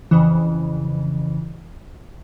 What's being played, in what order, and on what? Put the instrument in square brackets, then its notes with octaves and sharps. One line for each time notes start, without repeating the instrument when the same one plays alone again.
[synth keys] F2 C#3 E3